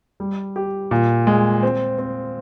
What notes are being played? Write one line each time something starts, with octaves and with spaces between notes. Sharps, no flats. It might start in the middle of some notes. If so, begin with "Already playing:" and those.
G3
G4
A#2
G#3
C4
C4